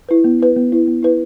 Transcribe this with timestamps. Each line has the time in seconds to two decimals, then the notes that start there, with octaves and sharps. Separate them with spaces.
0.09 E4 B4
0.24 B3
0.40 E4 B4
0.56 B3
0.72 E4 B4
0.87 B3
1.03 E4 B4